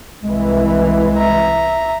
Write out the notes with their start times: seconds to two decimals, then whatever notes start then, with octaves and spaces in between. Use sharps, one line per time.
0.23 C2 E3 G#3
1.17 E5 A#5